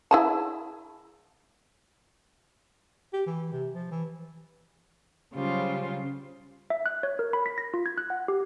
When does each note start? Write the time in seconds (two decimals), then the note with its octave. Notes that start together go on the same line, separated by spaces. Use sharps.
0.11 E4 G#4 A5
3.13 G4
3.26 E3
3.52 C3
3.74 F3
3.91 E3
5.34 C#3 F#3 G3 F4 C5
6.70 E5
6.86 F#6
7.03 C#5
7.19 A#4
7.33 B5
7.46 B6
7.58 A#6
7.74 F4
7.86 G#6
7.98 F#6
8.10 F#5
8.28 G4